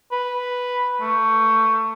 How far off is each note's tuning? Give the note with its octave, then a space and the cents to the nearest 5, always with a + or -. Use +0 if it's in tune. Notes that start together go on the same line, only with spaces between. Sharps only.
B4 +0
A3 +20